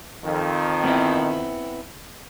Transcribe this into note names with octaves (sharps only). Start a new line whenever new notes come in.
F2 D#3
B3 C4 E4